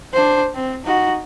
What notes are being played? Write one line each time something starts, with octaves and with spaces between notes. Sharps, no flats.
D4 C5
C4
D#4 F#4